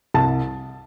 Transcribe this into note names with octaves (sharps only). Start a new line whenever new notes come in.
C2 A5